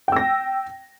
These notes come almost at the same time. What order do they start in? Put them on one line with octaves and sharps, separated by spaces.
G5 E6 A#6